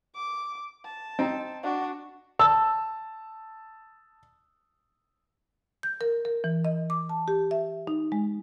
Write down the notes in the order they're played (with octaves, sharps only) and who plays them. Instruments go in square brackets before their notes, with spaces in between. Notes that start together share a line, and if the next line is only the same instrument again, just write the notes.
[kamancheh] D6
A5
[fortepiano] C4 D#4
[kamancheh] D4 F#4
[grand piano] A5 E6
[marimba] G6
A#4
A#4
E3
D#5
D6
A5
G4
E5
D#4
G#3